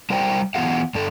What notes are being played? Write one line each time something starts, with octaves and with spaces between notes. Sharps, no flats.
G3 A#4 C5 D5 G5 A#5
E3 B3 F4 G#4 F5 F#5
G2 D4 A4